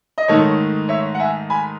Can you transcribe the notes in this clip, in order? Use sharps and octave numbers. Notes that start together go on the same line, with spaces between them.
D#5
G#2 D#3 A3 D#4 A4 C#5
C#5 E5
F#5
E5 G#5
G#5 B5